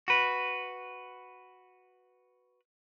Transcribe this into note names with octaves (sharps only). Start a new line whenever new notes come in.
F#4 B4